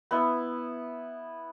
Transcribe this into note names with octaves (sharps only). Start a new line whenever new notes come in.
B3 E4